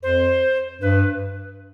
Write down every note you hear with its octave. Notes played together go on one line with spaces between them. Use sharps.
F2 C5
G2 B4